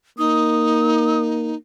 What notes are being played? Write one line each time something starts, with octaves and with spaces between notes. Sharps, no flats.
A#3 D#4 D#6